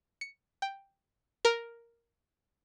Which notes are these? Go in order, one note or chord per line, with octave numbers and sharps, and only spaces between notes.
C#7
G5
A#4